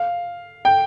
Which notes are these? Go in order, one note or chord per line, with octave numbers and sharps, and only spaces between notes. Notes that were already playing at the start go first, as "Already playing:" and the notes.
Already playing: F5
G5